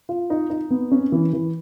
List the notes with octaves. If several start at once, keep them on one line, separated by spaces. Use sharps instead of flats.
F4
D#4
D#4
B3
C#4
E3
E3